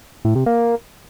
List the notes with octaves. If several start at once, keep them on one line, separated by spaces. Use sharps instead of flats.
A2
C3
A#3